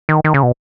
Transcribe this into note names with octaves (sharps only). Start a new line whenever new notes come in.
D#3
D#3
C#3
B2